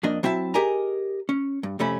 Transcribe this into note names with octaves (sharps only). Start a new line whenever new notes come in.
F2 A#3 D4 D#5
F#3 C4 E4 E5 A5
G4 G#4 A#4 D#5 G#5 A#5
C#4
G2
F2 C3 A3 C#4 B5